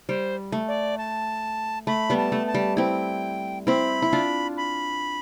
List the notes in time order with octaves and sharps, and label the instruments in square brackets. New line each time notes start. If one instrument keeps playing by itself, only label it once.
[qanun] G3 [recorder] C5
[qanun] A3
[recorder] D5
A5
[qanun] A3 [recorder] B5
[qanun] G3 B3
[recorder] A5
[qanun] A3
[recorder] A5
[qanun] G3
[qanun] C4 E4 [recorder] G5
[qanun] C4 E4 [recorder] B5
[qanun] E4
D4 F4
[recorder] B5